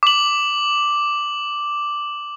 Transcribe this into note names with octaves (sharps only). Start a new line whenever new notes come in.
D6 F#7